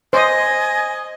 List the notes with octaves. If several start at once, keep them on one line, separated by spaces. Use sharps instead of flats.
C5 D#5 G#5 D#6